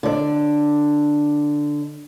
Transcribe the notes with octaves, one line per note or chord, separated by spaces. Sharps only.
D3 D5